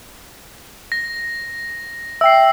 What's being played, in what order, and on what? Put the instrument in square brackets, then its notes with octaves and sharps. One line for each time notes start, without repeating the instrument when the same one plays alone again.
[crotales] A#6
[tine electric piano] E5 G5 [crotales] E6 C7